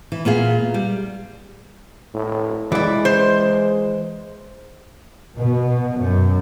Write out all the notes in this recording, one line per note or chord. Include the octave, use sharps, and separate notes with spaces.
E3
A#2 B3 G#4 F5
G3
A2
E3 G#3 E4 D5
C5
B2
F#2